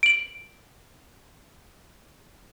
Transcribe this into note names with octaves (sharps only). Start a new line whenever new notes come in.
D7 F#7